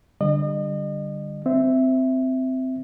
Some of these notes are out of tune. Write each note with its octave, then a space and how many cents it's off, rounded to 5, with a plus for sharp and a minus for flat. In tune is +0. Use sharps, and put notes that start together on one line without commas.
D3 +0 G3 +0 D#5 -40
C4 -15 E5 +0